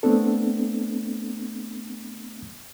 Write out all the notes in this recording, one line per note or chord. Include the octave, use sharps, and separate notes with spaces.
A3 B3 C4 D4 A4